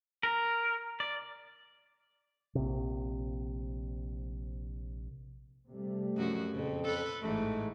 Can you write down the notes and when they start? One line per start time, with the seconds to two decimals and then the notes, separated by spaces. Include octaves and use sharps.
0.23 A#4
1.00 D5
2.55 A#1 C3
5.69 C3 G3 A3
6.16 F#2 F3 F#4
6.51 F2 A#2 C#3
6.84 A4 B4
7.22 A1 G#2 E3 A3